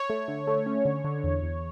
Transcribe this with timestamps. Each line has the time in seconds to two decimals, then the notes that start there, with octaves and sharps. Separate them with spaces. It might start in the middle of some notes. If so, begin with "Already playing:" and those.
Already playing: C#5
0.10 A3
0.28 D3
0.47 A3
0.66 C#4
0.85 D3
1.04 D3
1.24 E2
1.43 E2